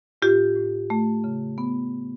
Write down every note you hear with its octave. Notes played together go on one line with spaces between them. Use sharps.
A2 F4 G4
A2
A3
C#3
B3